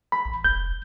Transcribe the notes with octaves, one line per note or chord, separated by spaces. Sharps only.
B5
A1
F1 G6